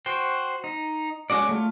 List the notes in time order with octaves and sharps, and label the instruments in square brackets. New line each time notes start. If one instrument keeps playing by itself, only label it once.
[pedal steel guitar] F#4 C5 G5
D#4
G#3 C#4 F#4 D5
A3 F4